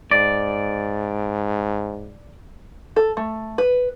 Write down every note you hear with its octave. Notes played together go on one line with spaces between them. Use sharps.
G#2 D5
A4
A3
B4